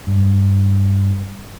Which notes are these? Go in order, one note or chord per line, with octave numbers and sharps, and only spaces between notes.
G2